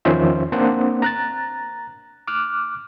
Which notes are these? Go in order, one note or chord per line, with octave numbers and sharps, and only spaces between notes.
E2 D#3 F3 C#4 C5 E5
A#3 C4 D4 C5 F#5
A#5 F#6 A6
D6 F6 F#6